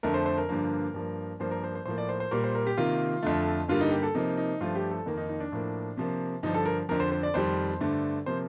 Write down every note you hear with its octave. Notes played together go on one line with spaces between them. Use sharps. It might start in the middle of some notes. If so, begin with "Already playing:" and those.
F2 D3 A3 A#4
C5
C5
A#4
G2 D3 F3 A#3
G2 F3 A#3
G2 F3 A#3 C5
A#4
C5
C5
A2 F3 A#3 C5
D5
C5
C5
A#2 G3 A#3 A#4
C5
A#4
G4
C3 D#3 A#3 F4
F2 D3 A3
G2 D3 G3 A#3 F4
D#4
G4
A4
C3 F3 A#3 D#4
D#4
G2 F3 A3 F4
G4
A4
F2 D#3 A#3
D#4
D#4
D4
A2 F3 A#3
C3 F3 A#3
G2 D3 F3 D#4
A4
A#4
F2 D3 F3 A#4
C5
C5
D5
F2 D#3 G3 C5
G2 D3 A3
C3 F3 A#3 C5